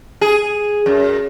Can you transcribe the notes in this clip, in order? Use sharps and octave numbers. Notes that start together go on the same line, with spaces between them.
G#4
F#2